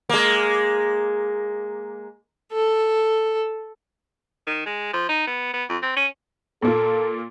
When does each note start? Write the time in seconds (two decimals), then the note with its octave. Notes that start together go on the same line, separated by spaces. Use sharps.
0.09 G#3 A#3
2.53 A4
4.47 D#3
4.66 G#3
4.93 F3
5.09 D#4
5.27 B3
5.53 B3
5.69 F2
5.82 C4
5.96 C#4
6.62 A#2 A#3 F4 A4